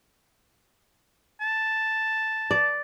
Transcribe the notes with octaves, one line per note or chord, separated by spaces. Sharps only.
A5
D5